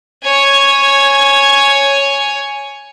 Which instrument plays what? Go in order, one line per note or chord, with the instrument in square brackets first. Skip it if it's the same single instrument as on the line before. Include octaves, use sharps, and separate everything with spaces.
[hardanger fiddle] C#5 G#5